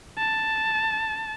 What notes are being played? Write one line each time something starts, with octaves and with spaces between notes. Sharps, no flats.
A5